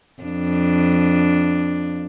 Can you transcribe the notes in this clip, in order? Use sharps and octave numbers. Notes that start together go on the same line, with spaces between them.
F2 D4